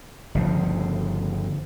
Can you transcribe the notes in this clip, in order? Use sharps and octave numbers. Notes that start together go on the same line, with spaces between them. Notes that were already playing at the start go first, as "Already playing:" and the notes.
G1 C#3 F3